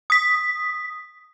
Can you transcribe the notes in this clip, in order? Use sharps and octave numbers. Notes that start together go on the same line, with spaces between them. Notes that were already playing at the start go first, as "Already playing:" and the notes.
D#6 B6